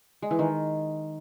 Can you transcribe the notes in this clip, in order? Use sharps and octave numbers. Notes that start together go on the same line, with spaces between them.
G#3
E3
D#3